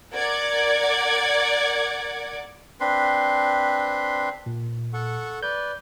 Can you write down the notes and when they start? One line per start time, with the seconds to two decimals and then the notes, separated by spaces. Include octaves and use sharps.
0.12 A#4 D5 F#5 D6 G#6
2.80 C4 D4 B4 C6
4.46 A#2
4.93 A4 F#5 C#6
5.43 B4 D5 G6